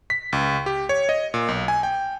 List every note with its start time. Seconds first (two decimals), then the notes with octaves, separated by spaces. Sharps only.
0.10 B6
0.33 C#2
0.66 G4
0.89 C#5
1.09 D#5
1.34 A#2
1.48 B1
1.68 G#5
1.83 G5